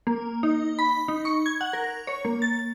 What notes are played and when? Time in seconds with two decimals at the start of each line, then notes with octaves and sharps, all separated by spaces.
0.07 A#3
0.43 D#4
0.79 B5
1.08 D#4
1.25 C#6
1.46 G#6
1.61 F#5
1.73 A#4
2.07 C#5
2.25 A#3
2.42 A6